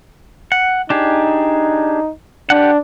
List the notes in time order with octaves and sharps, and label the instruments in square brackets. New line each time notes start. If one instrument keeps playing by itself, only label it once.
[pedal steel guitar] F#5
[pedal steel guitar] D4 G4 G#4 [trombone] D#4
[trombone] D4 [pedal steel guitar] G4 F#5